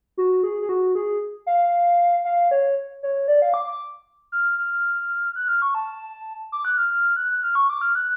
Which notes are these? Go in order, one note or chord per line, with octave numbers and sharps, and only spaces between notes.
F#4
G#4
G#4
F#4
G#4
F5
F5
C#5
C#5
D5
F5
D6
D6
F6
F6
F#6
F6
C#6
A5
D6
F#6
F6
F6
F#6
F6
C#6
D6
F6
F#6